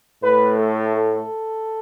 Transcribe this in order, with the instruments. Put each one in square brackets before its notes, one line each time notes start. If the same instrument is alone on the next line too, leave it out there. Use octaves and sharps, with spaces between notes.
[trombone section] A2 A3 B4
A4
A4